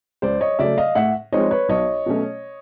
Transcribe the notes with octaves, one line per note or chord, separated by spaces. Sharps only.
C#2 C5 D5
C#5 D#5
C#3 F#3 A3 D5 E5
D#5 F5
A2 E5 F#5
F3 G#3 C4 D#4 C#5 D#5
B4 C#5
B1 C#5 D#5
B2 F#3 A3 C#4